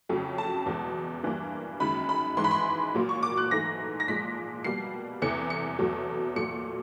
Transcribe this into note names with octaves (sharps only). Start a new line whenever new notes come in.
F2 C#3 F#3 A3
A5
E2 B2 G#3
G2 E3 G3 A#3
F#2 D#3 G#3 B5
B5
G#2 E3 G#3 C6
B5
C6
A#2 F#3 A#3
C#6
D6
F#6
G#2 E3 A3 A#6
A#6
A#2 F3 G#3 B6
B2 G3 A#3 C7
E2 C3 E3 A3 C#7
C#7
E2 B2 F#3 A3
A#2 F#3 A3 C#7